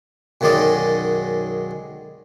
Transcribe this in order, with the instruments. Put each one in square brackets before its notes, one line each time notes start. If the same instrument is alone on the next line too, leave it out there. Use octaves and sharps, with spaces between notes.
[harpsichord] B1 F#2 D#3 G#3 D5 D#5